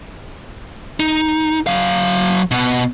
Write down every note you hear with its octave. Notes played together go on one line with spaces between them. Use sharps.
D#4
F#3 F5
B2 B3